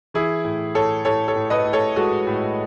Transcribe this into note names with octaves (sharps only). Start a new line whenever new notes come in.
E3 E4 G#4
A2
A2 A4 C#5
A2 A4 C#5
A4 C#5
A2
B4 D#5
A2
A4 C#5
G#3 F#4 A4
A2